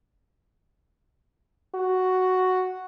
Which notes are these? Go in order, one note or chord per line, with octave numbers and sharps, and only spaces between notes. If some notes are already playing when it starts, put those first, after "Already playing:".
F#4